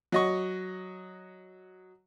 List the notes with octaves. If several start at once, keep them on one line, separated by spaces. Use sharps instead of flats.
F#3 D#5 C#6